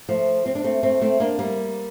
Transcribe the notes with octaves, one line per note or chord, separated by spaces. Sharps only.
F3 A3
C4
D4
A3 C4
A3 C4
A3 C4
A#3 D4
G3 A#3